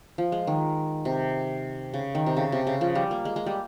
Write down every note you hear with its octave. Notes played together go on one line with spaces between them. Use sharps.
F3
G#3
D#3
C3
C#3
D#3
C3
C#3
C3
C#3
F3
G3
A#3
G#3
G#3
G3